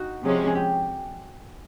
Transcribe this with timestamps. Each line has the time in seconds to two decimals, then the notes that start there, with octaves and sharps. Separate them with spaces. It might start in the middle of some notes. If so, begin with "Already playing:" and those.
Already playing: D#4 F#4
0.22 C3 F3 G#3 C#4
0.47 G#4
0.55 G4